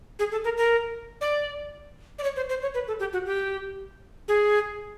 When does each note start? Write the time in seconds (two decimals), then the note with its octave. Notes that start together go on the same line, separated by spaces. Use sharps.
0.19 G#4
0.32 A4
0.44 A#4
0.57 A#4
1.21 D5
2.19 D5
2.23 C#5
2.36 C5
2.49 C5
2.62 C#5
2.74 B4
2.88 A4
3.00 G4
3.13 F#4
3.26 G4
4.28 G#4